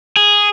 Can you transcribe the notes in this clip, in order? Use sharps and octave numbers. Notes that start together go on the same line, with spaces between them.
G#4